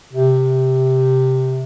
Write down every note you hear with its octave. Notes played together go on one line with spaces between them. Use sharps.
C3